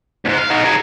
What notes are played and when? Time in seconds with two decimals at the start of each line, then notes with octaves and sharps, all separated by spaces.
0.25 D2 G#2
0.38 F5
0.51 D#4 F#4
0.64 G#4 A#4